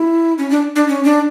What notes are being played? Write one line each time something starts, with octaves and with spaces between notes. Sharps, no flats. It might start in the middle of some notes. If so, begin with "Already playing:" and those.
Already playing: E4
C#4
D4
D4
C#4
D4